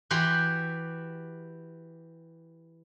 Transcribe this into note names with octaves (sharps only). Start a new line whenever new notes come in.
E3 F#4 G4 C6